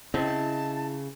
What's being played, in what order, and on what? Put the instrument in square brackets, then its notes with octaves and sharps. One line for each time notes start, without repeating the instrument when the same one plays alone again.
[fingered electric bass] C#3 [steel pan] C4 [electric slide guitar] E4 D#5 E5 [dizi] A5